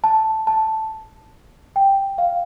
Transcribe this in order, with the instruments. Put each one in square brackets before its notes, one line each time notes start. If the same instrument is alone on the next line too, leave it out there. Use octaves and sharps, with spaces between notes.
[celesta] A5
A5
G5
F5